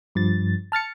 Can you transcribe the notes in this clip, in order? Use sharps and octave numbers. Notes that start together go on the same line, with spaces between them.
G2 F3 A6
A5 F6 A6 C#7